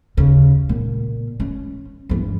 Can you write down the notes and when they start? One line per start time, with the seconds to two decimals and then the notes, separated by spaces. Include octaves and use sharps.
0.17 D#2 C#3
0.69 A#2
1.40 C#4
2.09 G2 E3